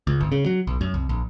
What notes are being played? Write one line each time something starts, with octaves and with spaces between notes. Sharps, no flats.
C#2
G1
C#3
F#3
B1
F#2
C2
A#1